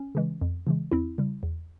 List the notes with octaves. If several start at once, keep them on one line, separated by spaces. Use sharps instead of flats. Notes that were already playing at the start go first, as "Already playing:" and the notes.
Already playing: C#4
C#3 E3 G#3
F2
C#3 E3 G#3
E2 C4 E4
C#3 G3
E2